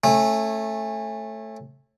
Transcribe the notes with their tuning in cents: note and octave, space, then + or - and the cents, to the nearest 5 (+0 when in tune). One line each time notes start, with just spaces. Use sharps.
A3 +0 C#4 -25